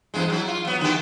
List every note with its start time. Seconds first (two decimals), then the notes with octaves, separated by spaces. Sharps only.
0.14 E2 G2 G#3
0.30 F#3 E4
0.48 F4
0.65 F#3 B3
0.81 D3 B3 G4